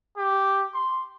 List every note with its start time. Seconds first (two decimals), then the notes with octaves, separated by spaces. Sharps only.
0.17 G4
0.74 C6